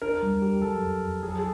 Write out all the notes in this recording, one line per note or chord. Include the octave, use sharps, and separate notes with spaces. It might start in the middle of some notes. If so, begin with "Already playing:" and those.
D4 A#4
G3
G4
F#3 A4
F2
F2
F#3 G#4
A4
G#4